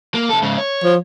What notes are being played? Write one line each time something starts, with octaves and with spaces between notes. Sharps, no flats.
A#3
C3 A4
G#2 C#3
C#5
F3